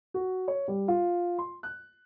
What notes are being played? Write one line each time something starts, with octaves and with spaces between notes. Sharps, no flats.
F#4
C#5
G3
F4
C6
F#6